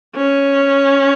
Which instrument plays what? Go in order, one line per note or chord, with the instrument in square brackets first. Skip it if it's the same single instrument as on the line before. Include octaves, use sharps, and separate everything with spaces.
[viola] C#4